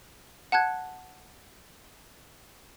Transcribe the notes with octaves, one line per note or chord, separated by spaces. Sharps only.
F#5 A5 F#6 G#6